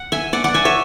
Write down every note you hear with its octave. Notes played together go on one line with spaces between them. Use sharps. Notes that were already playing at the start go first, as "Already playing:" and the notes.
Already playing: F#5
E5 G#5
D5 F#5
D5 F#5
E5 G#5
C#5 E5